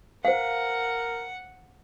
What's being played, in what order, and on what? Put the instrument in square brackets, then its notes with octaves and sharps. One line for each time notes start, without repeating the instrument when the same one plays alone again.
[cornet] A#4 [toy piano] C5 F5 [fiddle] F#5